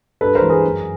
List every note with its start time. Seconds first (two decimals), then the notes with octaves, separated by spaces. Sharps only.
0.21 G2 A4 B4
0.35 A#4 C5
0.42 E3 G#3
0.49 G#4 A#4
0.64 F#2